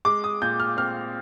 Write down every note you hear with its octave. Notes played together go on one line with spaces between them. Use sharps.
G#3 D6
D#6
A#2 G6
F6
C4 F6